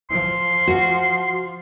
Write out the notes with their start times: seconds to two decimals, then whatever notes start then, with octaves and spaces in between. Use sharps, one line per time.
0.10 F3 C6
0.67 F#4